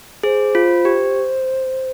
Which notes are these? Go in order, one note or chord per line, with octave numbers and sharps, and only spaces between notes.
G#4 C5
F4
G4